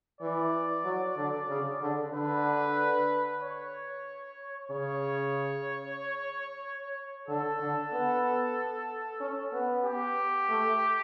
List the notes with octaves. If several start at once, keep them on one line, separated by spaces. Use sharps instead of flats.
E3 D5
F#3
D3
C#3
D3
D3 B4
C#5
C#3 C#5
D3 A4
D3
B3
C#4
B3
G4
A3